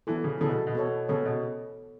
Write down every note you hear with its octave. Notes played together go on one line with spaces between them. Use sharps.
E3 B3 E4 A4
C#3
C#3 B3 E4 A4
B2
B2
B3 A4 C#5
C#3 B3 A4 C#5
B2